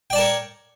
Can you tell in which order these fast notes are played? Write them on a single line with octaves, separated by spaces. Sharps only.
G5 D5 A5 A#4 C#5